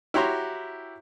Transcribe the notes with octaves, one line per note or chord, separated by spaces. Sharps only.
E4 F#4 G4 C#5 A#5 C6